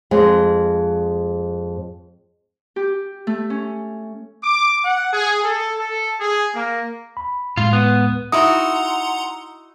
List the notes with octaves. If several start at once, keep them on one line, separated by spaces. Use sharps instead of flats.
F2 G#3
G4
A3
C#4
D6
F#5
G#4
A4
A4
G#4
A#3
B5
A2 G#3 F4
B3
D#4 E4 F#4 F#5 A#5 C6 D#6